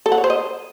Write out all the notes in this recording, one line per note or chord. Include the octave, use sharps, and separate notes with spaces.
A4
F#5
C#5
C5
D#5